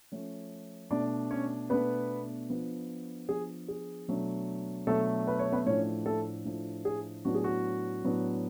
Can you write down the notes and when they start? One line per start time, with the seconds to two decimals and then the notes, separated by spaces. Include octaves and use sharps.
0.11 F3 A3 C#4
0.91 B2 A3 D4 D5
1.31 C#4 C#5
1.70 B2 A3 B3 D4 B4
2.50 F3 B3 D4
3.29 F3 B3 D4 G#4
3.68 G#4
4.08 B2 F#3 A3 D4
4.87 B2 F#3 A3 D4 A4
5.27 B4
5.39 C#5
5.52 B3 B4
5.66 A2 F3 A3 C#4 D4 C#5
6.06 A3 A4
6.45 A2 F3 A3 D4
6.85 G#4
7.25 A2 F#3 B3 D4 F#4
7.35 G#4
7.44 F#4
8.04 A2 F#3 B3 D4